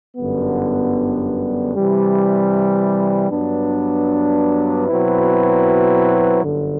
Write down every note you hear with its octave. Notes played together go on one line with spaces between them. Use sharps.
G1 F#2 D3 G3 B3
C3 E3 G3
G2 F#3 B3 D4
B2 F#3 C4 E4 B4
G1 F#2 D3